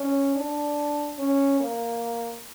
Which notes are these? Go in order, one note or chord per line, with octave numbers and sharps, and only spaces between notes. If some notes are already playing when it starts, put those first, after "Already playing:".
Already playing: C#4
D4
C#4
A#3